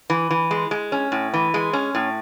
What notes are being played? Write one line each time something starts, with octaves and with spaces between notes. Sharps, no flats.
E3
E3
G#3
G#3
C#4
A2
E3
G#3
C#4
A2